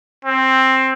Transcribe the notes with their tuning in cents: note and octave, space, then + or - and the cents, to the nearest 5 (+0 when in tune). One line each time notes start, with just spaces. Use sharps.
C4 +10